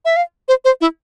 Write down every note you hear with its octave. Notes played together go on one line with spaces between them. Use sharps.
E5
F5
C5
C5
E4